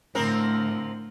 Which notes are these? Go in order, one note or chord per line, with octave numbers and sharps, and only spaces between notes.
A2 D3 F3 C4 A#4